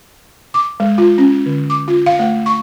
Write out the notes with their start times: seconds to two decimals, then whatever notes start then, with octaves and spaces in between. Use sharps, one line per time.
0.54 D6
0.80 G#3
0.98 F4
1.18 C#4
1.46 D3
1.70 D6
1.88 F4
2.06 F5
2.19 A3
2.46 C#6